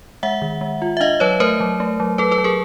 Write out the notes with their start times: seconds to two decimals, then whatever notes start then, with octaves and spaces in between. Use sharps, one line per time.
0.23 G#3 E5 F#5
0.42 D#3
0.61 G#3
0.82 F4
0.97 E5
1.00 D4 D#5 F5
1.20 F#3 B4 C#5
1.40 A3 A#4 C5
1.60 F#3
1.80 A3
2.00 F#3
2.18 F#3 A4 B4
2.31 A4 B4
2.38 F#3
2.44 G#4 A#4